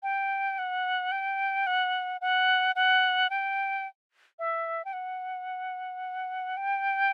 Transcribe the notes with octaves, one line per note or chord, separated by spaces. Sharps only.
G5
F#5
G5
F#5
F#5
F#5
G5
E5
G5
F#5
G5